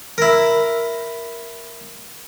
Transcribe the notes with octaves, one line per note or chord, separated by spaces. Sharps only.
E4 A#4